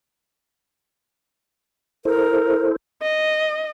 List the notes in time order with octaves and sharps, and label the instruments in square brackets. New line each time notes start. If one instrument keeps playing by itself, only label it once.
[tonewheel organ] E4 A4 C5 [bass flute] A#4
[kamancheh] D#5